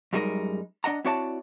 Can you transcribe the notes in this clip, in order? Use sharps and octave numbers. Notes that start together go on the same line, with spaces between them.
F#2 G3 G#3 D#4 A#4
D4 D#5 F#5 A#5
C4 E4 F#4 C#5 D5 A5